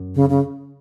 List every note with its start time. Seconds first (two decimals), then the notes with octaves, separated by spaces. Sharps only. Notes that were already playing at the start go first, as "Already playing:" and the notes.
Already playing: F#2
0.15 C#3
0.30 C#3